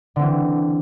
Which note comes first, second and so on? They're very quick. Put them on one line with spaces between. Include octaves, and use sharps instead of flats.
D3 C4 E3